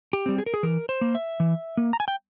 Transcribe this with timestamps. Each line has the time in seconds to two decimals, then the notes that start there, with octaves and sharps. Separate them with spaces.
0.13 G4
0.26 G3 C4
0.38 G#4
0.46 A#4
0.54 G#4
0.63 E3 A#4
0.89 C5
1.01 A#3
1.15 E5
1.40 E3
1.77 A#3
1.93 A#5
2.00 G#5
2.08 G5